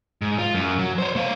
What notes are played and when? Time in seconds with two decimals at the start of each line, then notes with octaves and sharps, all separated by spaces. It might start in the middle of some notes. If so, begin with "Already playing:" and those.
0.22 G#2
0.39 F4
0.54 F#2
0.79 F#3
0.98 C5 C#5
1.16 A3 F5